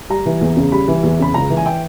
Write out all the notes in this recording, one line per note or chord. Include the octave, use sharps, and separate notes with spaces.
G3 A#5
E3
E2
C#3
G3 B5
E3
E2
C#3 B5
C#2 A#5
E3
G#5
G5